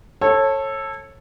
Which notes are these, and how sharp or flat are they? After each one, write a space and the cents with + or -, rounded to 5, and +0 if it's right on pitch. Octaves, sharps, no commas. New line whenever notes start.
A4 +0 C#5 -25